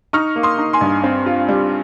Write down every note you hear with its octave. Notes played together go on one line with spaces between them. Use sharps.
D#4 C#6 F6
A#3
C6 D#6
D#4
G#5 C6
G2
C4
F4
G3